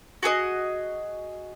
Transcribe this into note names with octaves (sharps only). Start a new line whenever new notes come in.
F#4 G#4 A4 D#5